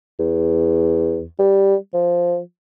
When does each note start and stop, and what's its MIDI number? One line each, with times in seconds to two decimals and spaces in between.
0.20 1.23 40
1.39 1.75 55
1.93 2.38 53